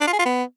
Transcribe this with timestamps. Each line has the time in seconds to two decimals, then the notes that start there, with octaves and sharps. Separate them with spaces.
0.01 D4
0.07 F4
0.13 G#4
0.19 F4
0.25 B3